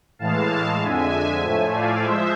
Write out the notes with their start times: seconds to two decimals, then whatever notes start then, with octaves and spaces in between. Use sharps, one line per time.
0.19 A2 E3 G#3 F5 A5
0.80 F2 D3 G#3 E5 G#5
1.42 A2 F3 A3
1.73 D5 F5
2.04 F3 G#3 C5 E5